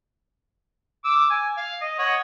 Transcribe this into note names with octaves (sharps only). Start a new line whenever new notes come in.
D6 E6
G#5
F5
D#5
C#5 D#5 F#5